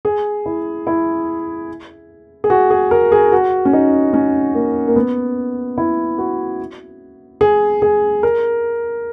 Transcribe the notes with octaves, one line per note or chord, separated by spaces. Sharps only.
G#4
E4
E4
G#4
F#4
G#4
A#4
G#4
F#4
C#4
D#4
C#4
A#3
A#3
B3
E4
F#4
G#4
G#4
A#4